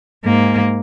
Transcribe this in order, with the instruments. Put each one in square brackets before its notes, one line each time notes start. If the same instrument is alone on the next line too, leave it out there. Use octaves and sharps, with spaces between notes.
[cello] G#2 A#3